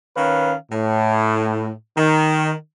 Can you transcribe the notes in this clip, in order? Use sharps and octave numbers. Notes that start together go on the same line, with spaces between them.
D#3 C#4 B4 C#5 F5
A2
D#3